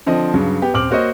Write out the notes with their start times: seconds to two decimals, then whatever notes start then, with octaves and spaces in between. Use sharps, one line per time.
0.06 D3 F3 C4 D#5
0.34 G2 C#3 F#3
0.62 B3 G4
0.74 D#1 C4 D6 F6 F#7
0.91 A#3 F#4 C5 C#5 D#5